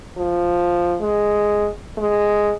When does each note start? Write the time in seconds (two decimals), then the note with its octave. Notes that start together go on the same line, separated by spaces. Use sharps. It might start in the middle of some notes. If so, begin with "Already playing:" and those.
0.17 F3
1.01 G#3
1.98 G#3